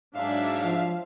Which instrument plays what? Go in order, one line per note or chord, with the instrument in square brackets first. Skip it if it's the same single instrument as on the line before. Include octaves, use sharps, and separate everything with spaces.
[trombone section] G#2 [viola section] F#3 D4 E5 [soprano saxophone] F5
[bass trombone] F3